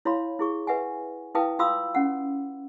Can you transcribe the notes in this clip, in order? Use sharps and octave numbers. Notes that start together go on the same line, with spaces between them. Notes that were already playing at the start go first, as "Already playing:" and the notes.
E4 C#5 F5 B5 C6
E4 G#4 C#6
B4 E5 F#5 G#5
E4 B4 F5 G5 A5 D#6
F4 F5 B5 C6 D#6 E6
C#4 F#5